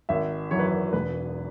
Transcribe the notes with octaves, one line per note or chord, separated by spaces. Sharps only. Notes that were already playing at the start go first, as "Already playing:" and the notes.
G#1 E5
F#2 E3 C#5
B4
C#5
E1 B4